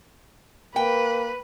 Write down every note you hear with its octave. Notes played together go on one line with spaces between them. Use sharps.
A#3 B4 G5